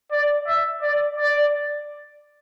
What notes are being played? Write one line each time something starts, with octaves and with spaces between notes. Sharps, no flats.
D5
E5
D5
D5